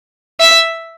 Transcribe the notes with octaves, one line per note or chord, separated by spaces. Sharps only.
E5